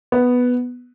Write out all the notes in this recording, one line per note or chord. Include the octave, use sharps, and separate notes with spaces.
B3